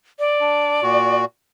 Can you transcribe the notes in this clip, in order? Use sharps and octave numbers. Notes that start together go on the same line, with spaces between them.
D5
D4
A#2 F#4